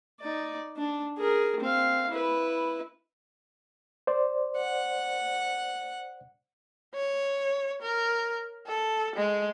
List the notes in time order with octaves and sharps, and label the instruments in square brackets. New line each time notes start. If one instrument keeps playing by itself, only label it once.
[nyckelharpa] D#4 D5
D4
G#4 A#4
C4 F5
E4 B4
[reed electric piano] C5 D5
[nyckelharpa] F#5
[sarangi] C#5
A#4
A4
G#3